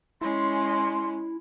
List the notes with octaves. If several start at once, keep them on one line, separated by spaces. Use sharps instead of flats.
G#3 C#4 E4 C6